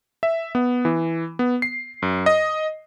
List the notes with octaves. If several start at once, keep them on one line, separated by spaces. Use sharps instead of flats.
E5
B3
E3
B3
C7
F#2
D#5